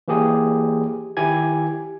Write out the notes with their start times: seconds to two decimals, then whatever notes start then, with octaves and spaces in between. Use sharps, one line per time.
0.08 E3 A#3 G4 G#4
1.17 D#3 E4 G4 G#5 G#6